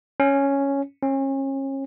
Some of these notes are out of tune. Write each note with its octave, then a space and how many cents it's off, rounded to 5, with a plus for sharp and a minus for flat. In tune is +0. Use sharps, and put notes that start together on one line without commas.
C#4 +0
C#4 -35